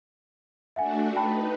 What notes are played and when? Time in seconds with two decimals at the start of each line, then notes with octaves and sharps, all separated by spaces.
0.76 A3 D4 F#4 E5 F#5 G#5
1.16 D#4 B4 G5 A5 B5